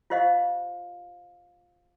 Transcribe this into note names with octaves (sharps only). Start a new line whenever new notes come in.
F4 G4 C5 D#5 F5